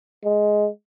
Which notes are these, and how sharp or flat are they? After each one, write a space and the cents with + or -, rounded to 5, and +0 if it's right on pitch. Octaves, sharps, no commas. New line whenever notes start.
G#3 +10